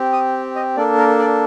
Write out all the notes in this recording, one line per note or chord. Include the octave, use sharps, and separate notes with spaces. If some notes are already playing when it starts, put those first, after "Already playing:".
Already playing: C4 G4
D#6
D#5
A#3 D4 A4 D5
A#4
D5